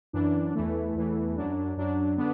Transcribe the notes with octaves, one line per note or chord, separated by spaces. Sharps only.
F#2 E3 D4
E2 E3 A3
E2 E3 A3
F#2 F#3 D4
F#2 F#3 D4
D3 B3 D4